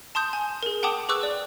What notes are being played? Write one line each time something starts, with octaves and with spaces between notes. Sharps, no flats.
A5 C6 D#6 G6
G#5
G#4 A#4
F#5 G5 A5 D6 D#6
G#4 B4 C#6 D6 E6 F#6
D5